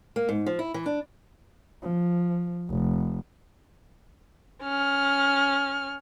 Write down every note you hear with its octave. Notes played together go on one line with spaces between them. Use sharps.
A#3
G#2
F3
E4
E3
D4
F3
F1
C#4 F6